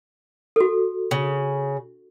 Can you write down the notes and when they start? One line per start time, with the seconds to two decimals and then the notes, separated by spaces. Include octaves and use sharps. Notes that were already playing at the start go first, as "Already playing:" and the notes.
0.56 F#4 A4
1.11 C#3